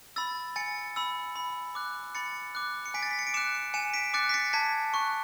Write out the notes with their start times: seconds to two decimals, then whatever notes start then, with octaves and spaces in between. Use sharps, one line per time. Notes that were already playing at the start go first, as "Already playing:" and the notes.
0.16 B5 E6 A6
0.56 G#5 A6 C#7
0.96 B5 E6
1.36 B5
1.75 D6 F#6
2.15 B5 A6 C#7
2.55 D6 F#6
2.86 C#7
2.94 G#5 B6 D7
3.03 A6
3.11 B6
3.19 C#7
3.27 D7
3.34 D6 F#6 C#7 E7
3.74 G#5 C#7 E7
3.94 B6 D7
4.14 D6 F#6 A6 C#7
4.29 B6
4.34 A6 C#7
4.53 A5 G#6 B6
4.94 C#6 F#6